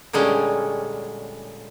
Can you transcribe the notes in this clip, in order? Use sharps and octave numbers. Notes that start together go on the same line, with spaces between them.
A#2 D3 G3 G#3 C#4